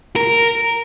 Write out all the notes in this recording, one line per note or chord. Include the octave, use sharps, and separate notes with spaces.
A#4